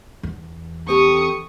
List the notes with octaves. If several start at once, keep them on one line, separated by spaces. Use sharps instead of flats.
E2
C4 G4 A4 C#6 D#6